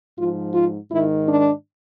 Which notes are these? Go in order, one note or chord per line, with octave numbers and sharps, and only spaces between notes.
G#2 F3 F4
F4
G#2 D#3 E4
D4